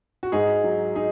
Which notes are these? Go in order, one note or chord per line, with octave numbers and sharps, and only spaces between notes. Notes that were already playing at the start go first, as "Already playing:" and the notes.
F#4
G#2 D#4 G#4
F#3
D#4 G#4